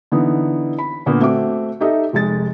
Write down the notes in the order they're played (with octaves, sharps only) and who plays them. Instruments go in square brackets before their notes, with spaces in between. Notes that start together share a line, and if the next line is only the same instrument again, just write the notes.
[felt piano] D3 E3 B3 D#4
B5
A#2 D3 A#3 B3
A3 C4 F#4 D6
D#4 G4 A4 D#5 E5
F1 G#3 A6